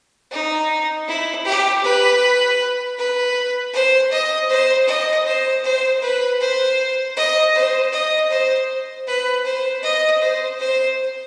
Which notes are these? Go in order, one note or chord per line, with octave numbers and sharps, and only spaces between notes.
D#4
E4
G4
B4
B4
C5
D#5
C5
D#5
C5
C5
B4
C5
D#5
C5
D#5
C5
B4
C5
D#5
C5
C5